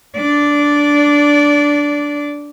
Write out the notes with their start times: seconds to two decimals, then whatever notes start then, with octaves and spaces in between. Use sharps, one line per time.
0.17 D4 D5